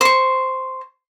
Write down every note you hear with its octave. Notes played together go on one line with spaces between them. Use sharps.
C5 C#6